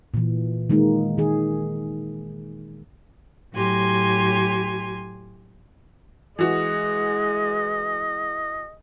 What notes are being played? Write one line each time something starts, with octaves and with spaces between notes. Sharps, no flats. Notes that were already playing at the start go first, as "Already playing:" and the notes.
A#2 E3
D#3 G#3 A#3 D#4
D#3 G#4
A2 F#3 G4 G#5 C6
E3 G#3 F#4 D#5